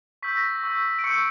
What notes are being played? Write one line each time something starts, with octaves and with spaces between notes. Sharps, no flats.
C#6 E6 G6 B6
A#6
C#6 E6 G6
D7
C#6 E6 G6 C#7